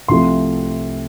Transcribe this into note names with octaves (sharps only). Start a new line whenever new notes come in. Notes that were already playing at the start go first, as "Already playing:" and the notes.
C2 C3 F3 A3 C6